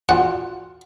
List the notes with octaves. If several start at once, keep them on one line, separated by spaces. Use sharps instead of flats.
F4 F#4 F#5